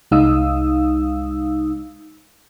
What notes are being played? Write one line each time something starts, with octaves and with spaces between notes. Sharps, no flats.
C2 G#3 D#4 F5 D#6 E6